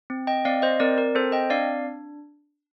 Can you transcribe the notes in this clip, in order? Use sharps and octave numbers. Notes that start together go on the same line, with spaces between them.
C4
D#5 G5
C4 D5 F5
C5 D#5
C4 A#4 D5
A#4
C4 A4 C5
D#5 G5
D4 D5 F5